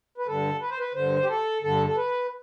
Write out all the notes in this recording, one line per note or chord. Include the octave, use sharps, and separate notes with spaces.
B4
G2 D3 A4
B4
C5
B4
G2 D3 C5
G4
A4
G2 D3 A4
A4
B4